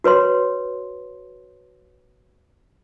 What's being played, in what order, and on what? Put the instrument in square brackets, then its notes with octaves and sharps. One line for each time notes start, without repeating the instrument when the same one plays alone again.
[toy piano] F#4 B4 C#5 C6